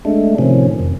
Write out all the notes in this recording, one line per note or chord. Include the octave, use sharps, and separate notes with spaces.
G#3 A3 D4
A2 C3 D#3 F3 C#4
F2